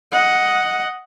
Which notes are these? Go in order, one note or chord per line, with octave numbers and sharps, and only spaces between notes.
D#5 F#5